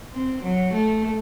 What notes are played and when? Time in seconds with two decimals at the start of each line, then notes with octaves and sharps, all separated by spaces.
0.13 C4
0.43 F#3
0.73 A3